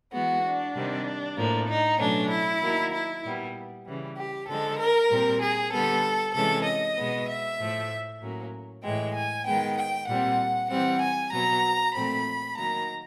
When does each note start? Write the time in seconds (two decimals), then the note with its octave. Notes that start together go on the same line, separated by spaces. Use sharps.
0.12 E3 G#3 B3 F#4
0.44 D4
0.75 C3 D#3 G3 C4
1.37 A2 F3 A#3
1.69 D#4
1.99 B2 F#3 A3 C#4 D4
2.30 E4
2.62 D#3 F#3 A#3
2.93 E4
3.24 A#2 G3 B3
3.86 C#3 E3 G3
4.17 G4
4.48 D3 F3 G#3 A4
4.79 A#4
5.11 A#2 G3 C4
5.41 G#4
5.73 D3 G3 B3 A4
6.34 C3 E3 G#3 C#4 A4
6.66 D#5
6.97 B2 G#3 B3
7.28 E5
7.59 A2 F3 A3
8.21 A2 F#3 A#3 C#4
8.84 A2 E3 G#3 G5
9.14 G#5
9.46 D#3 G#3 B3 G5
9.77 G5
10.08 A#2 G3 C4 F#5
10.70 E3 G3 C4 F#5
11.01 G#5
11.32 B2 F#3 B3 A#5
11.95 A#2 F3 A3 C4 B5
12.57 D#3 F#3 A#3 A#5